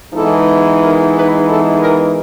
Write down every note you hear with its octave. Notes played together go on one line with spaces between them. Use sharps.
E3 G#3 B3 D#4 A4
A#4
B4
A4
A#4